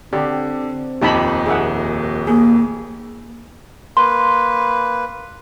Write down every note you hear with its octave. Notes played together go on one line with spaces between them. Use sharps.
D3 C4 G4
D#1 F2 D#4 G4 A5 B5
D#2 G#4 E5 F#5
A#3 G#4
A#3 B4 C6